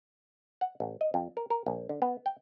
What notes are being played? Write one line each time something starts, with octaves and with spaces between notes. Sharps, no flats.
F#5
A1
D#5
F2
A#4
A#4
A#1
D3
B3
G5